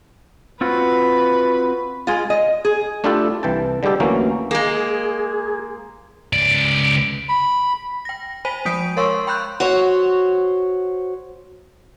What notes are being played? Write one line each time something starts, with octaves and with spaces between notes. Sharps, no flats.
C4 F4 F#4 B4
G#3 F4
D#5
G#4
A3 D4 E4 F4 G4 A4
C2 E3 G5 A5
D3 G3 G#3 G4 A4
D2 E3 F#3 A#3 C#4
G#3 A#3 G#4
C#2 D5
B5
G5 A#6
C5 G#5 B5 B6 D#7
F3 G#3 D#6 G6 B6 D7
A#4 C#5 F5 C6 C#6 E6
G5 B5 C6 F#6 G6
F#4 C5 C#5